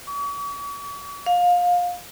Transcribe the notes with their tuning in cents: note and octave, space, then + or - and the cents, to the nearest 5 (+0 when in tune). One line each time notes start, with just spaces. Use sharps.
C#6 +45
F5 +25